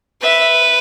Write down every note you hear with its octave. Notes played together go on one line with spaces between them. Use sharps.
B4 E5